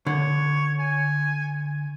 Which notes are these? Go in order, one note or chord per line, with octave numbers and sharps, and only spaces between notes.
D3 C#5
G#5